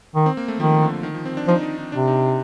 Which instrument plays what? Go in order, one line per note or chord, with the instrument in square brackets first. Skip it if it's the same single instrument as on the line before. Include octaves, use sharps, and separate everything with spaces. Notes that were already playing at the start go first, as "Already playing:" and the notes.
[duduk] D#3
[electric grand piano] C4
A#3
A3
[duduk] D#3 [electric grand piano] F3
[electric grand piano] D3
D#3
F3
C4
D4
[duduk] F3 [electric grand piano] D#4
[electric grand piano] D#4
D#4
[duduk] C3 [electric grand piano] D4
[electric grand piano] D#4